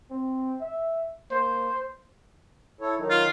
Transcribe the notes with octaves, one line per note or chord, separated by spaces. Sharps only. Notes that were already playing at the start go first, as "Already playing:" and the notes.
C4
E5
A#3 C5
E4 A4 C#5
D#3 F#3 D#4
F4